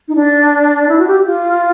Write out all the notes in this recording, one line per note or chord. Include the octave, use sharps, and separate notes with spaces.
D#4
D4
E4
F#4
G4
F4